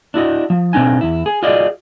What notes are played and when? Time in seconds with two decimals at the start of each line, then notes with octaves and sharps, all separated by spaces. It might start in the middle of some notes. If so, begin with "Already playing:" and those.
0.14 D4 E4 F#4 D#5
0.50 F3
0.73 B2 C4 D4 D#4 G#5
1.01 E2 E4
1.26 G#4
1.43 F4 F#4 G#4 D5 D#5